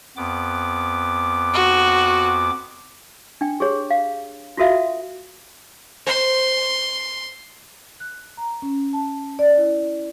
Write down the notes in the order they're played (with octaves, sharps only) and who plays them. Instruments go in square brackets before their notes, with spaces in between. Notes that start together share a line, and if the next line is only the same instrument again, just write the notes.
[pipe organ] F2 B3 D6
[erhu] F#4
[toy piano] D4 G5
G4 G#4 C#5
F5
F4 F#4 A4 E5 F5
[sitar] C5 [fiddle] C6
[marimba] F#6
A#5
C#4
A5
D5
E4